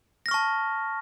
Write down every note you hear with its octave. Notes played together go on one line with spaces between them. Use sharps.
A5 C#6 F6 A#6